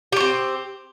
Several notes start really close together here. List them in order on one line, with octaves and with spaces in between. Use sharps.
G4 C#4 C4